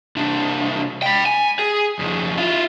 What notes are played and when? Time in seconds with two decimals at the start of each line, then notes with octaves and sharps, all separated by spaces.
0.16 C2 D4
1.02 G5 B5
1.26 G#5
1.59 G#4
1.99 F2 C#3
2.37 E4 F4